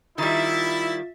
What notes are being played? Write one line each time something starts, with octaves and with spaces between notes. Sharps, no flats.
D#3 G3 E4 F4 E5 A6